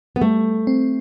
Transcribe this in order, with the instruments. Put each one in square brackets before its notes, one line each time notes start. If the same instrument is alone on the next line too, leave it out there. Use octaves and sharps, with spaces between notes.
[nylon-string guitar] B3
[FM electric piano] G3 [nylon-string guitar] A3
[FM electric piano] C4